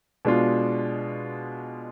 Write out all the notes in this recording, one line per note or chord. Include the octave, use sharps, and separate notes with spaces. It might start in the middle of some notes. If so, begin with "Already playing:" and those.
B2 G#3 D4 F4